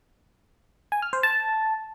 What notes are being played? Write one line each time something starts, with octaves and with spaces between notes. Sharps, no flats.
G#5
F6
C5
A5